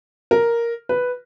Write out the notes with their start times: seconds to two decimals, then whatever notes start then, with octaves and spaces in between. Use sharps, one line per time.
0.31 A#4
0.89 B4